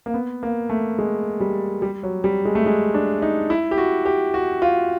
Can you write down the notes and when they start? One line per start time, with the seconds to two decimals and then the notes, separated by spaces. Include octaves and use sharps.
0.06 A#3
0.14 B3
0.43 A#3
0.69 A3
0.98 G#3
1.40 G3
1.82 G3
2.03 F#3
2.24 G3
2.45 G#3
2.55 A3
2.66 G#3
2.94 D4
3.22 D#4
3.50 E4
3.71 G4
3.78 F#4
4.05 G4
4.34 F#4
4.62 F4